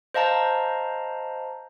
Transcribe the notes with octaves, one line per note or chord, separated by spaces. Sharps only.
C5 D#5 F5 A5 A#5